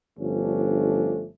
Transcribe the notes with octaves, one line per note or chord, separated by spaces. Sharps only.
G1 F3 A3 C#4 D4